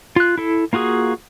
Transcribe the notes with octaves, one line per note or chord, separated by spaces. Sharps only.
F4 F#6
E4 A4
A#3 F4 F#4 G#4